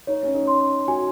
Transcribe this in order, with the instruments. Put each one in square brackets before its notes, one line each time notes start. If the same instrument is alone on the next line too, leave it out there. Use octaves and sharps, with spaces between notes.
[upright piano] D#4 [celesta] C#5
[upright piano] C#4
D#4
[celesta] C6
[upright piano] F#4 [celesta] G#5